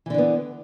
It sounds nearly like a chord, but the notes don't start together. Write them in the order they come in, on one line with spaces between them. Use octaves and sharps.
E3 D3 D4 B3